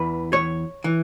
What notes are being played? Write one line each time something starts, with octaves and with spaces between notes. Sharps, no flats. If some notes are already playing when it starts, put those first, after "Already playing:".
Already playing: E2 E3 B4
C#5
E3